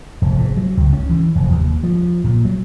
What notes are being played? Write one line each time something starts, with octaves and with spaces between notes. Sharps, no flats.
F1
G#2
F#3
C#2
C#4
E3
F1
D#2
F3
A#2
F#3